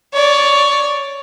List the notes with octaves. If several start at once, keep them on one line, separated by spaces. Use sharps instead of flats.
C#5 D5